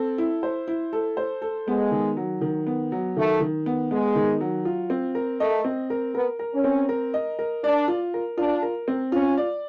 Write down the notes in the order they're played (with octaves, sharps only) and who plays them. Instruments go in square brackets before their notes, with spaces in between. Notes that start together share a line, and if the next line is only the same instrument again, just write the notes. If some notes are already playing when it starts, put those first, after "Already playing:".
Already playing: [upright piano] C4 A4
E4
C5
E4
A4
C5
A4
[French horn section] G#3 [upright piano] B3
[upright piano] D#3
F#3
D#3
B3
F#3
[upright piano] D#3 [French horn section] A3
[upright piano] D#3
B3
[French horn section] G#3 [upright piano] B3
[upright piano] D#3
F#3
F4
C4
A#4
[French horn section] A3 [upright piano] D#5
[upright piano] C4
A#4
[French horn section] B3 [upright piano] A#4
[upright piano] A#4
[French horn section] C#4
[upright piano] C4
A#4
D#5
A#4
[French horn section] D4 [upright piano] D5
[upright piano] F4
A#4
[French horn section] D4 [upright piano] F4
[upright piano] A#4
C4
[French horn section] C#4 [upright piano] F4
[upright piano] D5